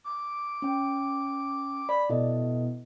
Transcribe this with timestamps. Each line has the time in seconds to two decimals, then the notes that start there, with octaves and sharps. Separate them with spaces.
0.04 D6
0.62 C#4 G5
1.89 D5 B5
2.10 B2 E4 A4 D#5